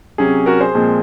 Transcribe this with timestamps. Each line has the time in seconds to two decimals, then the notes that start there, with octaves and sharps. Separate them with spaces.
0.18 C3 F#3 C#4 G#4
0.46 F#4 A#4
0.61 G#4 C5
0.75 A#2 F3 G#3 C4